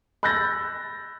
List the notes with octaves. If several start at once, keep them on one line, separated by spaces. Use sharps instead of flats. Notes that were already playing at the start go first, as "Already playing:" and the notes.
B5 E6 F#6 G6 A6 A#6